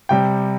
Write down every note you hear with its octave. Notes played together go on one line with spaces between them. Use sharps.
C3 G3 G5